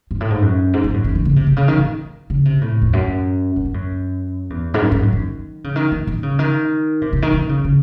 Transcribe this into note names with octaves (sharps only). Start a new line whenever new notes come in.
G#2
A2
G#2
F#2
G#2
G#2
F#2
D#3
D#3
C#3
C3
C3
C#3
D#3
D#3
C#3
C3
A2
E2
F#2
F#2
G#2
F#2
E2
G#2
F#2
G#2
F#2
D#3
C#3
D#3
D#3
D#3
C#3
D#3
C3
C3
D#3
D#3
C#3
C#3